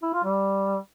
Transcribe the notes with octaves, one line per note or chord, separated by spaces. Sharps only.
E4
F4
G3